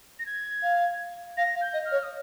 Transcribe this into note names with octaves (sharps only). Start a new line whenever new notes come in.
A#6
G#6
F5
F5 A#6
F5
G6
D#5
F6
C#5
D#6